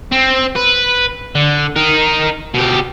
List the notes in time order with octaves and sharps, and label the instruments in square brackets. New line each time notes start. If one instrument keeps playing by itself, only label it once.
[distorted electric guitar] C4
B4
D3
D#4 A#4
B2 G4